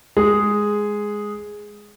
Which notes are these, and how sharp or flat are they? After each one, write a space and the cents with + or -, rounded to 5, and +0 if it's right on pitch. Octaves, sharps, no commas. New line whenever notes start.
G#3 +0 G#4 +0